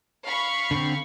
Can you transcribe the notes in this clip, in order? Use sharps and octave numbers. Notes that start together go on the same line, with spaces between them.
F5 B5 C#6
D3 C4